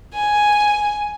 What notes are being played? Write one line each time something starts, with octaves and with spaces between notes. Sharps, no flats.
G#5